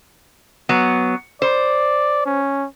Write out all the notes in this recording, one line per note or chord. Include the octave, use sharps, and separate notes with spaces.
F#3 B3
C5 D5
C#4